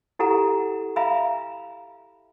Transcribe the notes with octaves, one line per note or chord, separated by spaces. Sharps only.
E4 G4 A4 F#5 G#5 A#5
E5 F5 G#5 A#5 B5